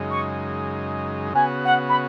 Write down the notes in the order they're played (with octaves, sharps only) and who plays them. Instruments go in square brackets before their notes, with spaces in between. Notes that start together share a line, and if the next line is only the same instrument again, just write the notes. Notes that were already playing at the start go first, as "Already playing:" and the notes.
Already playing: [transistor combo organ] F#2 C#3 G#3 D#4
[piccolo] C#6
[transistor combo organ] C#3 B3 F#4 [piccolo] G#5
[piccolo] F#5
B5